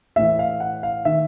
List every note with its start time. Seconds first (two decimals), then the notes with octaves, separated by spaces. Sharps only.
0.16 A2 E3 E5
0.39 F5
0.60 F#5
0.83 F5
1.05 D#3 E5